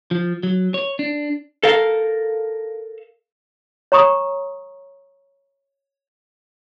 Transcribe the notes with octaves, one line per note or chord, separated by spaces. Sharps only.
F3
F#3
C#5
D4
A4 A#4 F5
C#5 A#5 C#6 D#6